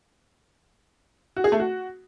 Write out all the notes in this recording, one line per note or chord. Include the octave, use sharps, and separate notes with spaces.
F#4
G#4
A3
F#4